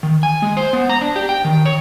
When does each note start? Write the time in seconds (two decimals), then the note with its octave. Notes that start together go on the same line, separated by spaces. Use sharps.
0.03 D#3
0.23 G#5
0.42 G#3
0.57 C5
0.73 B3
0.89 A#5
1.01 D4
1.16 G4
1.29 G5
1.45 D#3
1.66 C#5